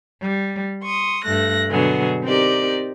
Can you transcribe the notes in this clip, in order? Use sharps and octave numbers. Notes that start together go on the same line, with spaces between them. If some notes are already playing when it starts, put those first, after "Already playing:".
G3
C6 C#6 D#6
G2 A3 F#6 A#6
B2 D3 F#3 B3 G#4
C4 D#4 G4 A#4 D5